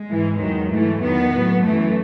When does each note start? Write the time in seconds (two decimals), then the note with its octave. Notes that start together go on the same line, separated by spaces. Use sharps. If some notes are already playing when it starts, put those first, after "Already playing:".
Already playing: G#3
0.09 G#2 E3
0.39 E2 D#3 F#3
0.70 G#2 E3 A3
1.02 E2 D#3 F#3 B3
1.33 A2 F#3
1.64 F#2 E3 A3